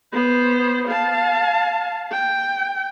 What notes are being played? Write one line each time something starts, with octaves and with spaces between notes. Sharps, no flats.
B3 C5
F5 A5
G5